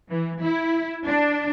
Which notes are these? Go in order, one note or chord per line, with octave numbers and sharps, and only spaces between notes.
E3
E4
D4